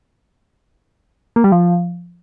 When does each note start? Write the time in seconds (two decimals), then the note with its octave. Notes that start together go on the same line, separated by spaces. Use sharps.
1.36 A#3
1.44 G3
1.52 F3